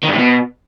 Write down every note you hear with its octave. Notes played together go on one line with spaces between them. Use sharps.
D#3
G2
A2
B2